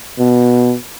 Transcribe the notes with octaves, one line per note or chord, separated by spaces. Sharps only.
B2